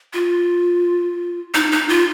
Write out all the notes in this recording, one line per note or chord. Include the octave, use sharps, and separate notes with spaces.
F4
D#4
D#4
F4